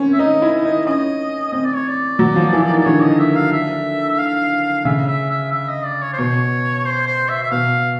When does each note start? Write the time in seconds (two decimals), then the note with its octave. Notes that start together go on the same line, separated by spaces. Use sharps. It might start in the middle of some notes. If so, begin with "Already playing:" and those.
Already playing: C4 C#4
0.13 E5
0.19 D#4 D#5
0.42 E4
0.65 D#4
0.86 C#4 D#5
1.52 C4 D#5
1.65 D5
1.76 C#5
1.88 D5
2.19 F#3
2.36 F3
2.53 E3
2.69 D#3
2.79 D5
2.85 D3 C#5
3.02 D#5
3.19 E5
3.36 F5
3.52 E5
4.18 F5
4.85 C#3 E5
5.07 E5
5.30 E5
5.52 E5
5.68 D#5
5.85 D5
6.02 C#5
6.13 C5
6.18 B2 C#5
6.85 C5
7.07 C5
7.29 E5
7.42 E5
7.51 B2 F5